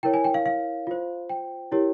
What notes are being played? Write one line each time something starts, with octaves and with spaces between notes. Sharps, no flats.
E4 A#4 C#5 G5
G#5
G5
F5
F5
F4 C5
G5
E4 G4 A#4 C#5